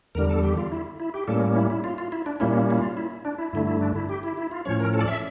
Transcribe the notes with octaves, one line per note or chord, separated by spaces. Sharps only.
E2 D3 G3 A#4
A4
G4
F4
E4
E4
G4
A2 G3 A#3 C#4 A4
E4
E4
F4
F4
E4
D4
A#2 G3 A#3 C#4 E4
E4
E4
F4
E4
D4
E4
G2 D3 A3 E4
E4
D4
E4
G4
E4
E4
F4
A2 F3 C#4 C#5
A#4
A4
D5
E5